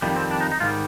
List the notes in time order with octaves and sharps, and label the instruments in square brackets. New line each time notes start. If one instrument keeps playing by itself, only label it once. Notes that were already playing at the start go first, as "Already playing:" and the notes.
[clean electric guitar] F2 D#3 G3
C4
D4
D#4
D#4
G#2 D#3 G3 F4